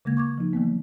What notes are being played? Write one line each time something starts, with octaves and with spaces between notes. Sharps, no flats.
C#3 G#3 A#3 G#6
C#6 D6 G#6
F3 D#4
E3 F#3 A#3 B3